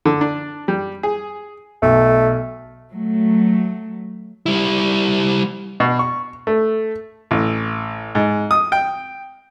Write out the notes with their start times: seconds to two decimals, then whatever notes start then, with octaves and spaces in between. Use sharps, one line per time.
0.05 D3
0.21 D4
0.68 G3
1.03 G#4
1.82 B1 A3
2.92 F#3 A3
4.46 G3 E4
5.80 B2
5.99 C#6
6.47 A3
7.31 A1
8.15 G#2
8.51 D#6
8.72 G5